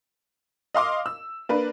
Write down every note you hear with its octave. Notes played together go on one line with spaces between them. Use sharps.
D#5 F5 C6 D6
E6
A#3 D4 B4